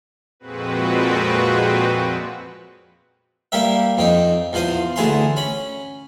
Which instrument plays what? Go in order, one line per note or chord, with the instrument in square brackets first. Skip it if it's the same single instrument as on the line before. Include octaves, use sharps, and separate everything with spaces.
[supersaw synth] F2 A#2 G#3 C4 F#4 B4
[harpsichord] G3 A#3 G4 A#4 E5
F2 C4 D#4
E2 F3 F4 C5 D#6
D2 E3 G#4 A5 A#5 C6
C#4 B5